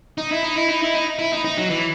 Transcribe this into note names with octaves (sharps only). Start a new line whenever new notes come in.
D#4
E4
D#4
E4
D#4
E4
D#4
E4
D#4
D#4
F#3
E3